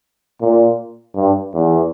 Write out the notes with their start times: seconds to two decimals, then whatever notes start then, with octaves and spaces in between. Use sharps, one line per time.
0.41 A#2
1.15 G2
1.54 E2